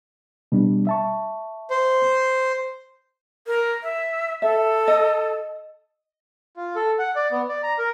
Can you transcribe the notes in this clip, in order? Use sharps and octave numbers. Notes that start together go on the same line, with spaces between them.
B2 G3 D4
E5 A5 C#6
C5
A#4
E5
A4 E5
D#5
F4
A4
F#5
D5
B3
D5
A#5
A#4